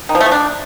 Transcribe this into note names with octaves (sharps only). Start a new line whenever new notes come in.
D#3
F3
A3
F3
D4